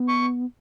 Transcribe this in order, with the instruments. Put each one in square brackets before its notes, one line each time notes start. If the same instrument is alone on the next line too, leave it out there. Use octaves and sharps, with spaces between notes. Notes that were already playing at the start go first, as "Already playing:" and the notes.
Already playing: [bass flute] B3
[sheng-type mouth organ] C#6